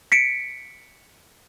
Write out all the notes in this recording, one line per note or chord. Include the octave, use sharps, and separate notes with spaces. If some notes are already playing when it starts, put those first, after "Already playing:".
B6 C#7 D7